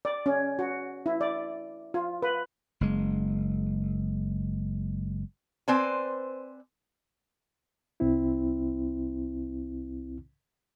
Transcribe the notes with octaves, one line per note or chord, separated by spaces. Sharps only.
D5
C#4
F#4
E4
D5
F4
B4
F#1 G#3
C4 B4 C5 D5 G#5
C2 C4 E4